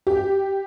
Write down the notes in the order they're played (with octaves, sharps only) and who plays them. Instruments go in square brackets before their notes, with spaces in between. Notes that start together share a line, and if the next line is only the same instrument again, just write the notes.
[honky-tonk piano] G4